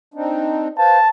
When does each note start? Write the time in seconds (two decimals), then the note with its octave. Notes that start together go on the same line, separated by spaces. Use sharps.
0.14 C4 D4 D#4
0.78 B4 C5 F5 A5